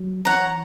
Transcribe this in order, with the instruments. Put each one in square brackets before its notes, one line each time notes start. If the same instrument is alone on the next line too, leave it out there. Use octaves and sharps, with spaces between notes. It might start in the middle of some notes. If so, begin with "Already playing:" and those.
Already playing: [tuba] F#3
[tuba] E3 [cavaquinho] C#5 F#5 A#5